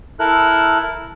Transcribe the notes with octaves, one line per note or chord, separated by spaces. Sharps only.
E4 A4 A#4 F#6